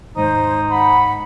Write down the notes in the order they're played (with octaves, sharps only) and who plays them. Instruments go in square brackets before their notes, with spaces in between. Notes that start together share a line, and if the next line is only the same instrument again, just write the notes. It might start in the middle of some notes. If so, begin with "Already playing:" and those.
[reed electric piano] D#2 G#2 [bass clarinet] D#4 [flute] C5
[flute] F#5 [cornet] B5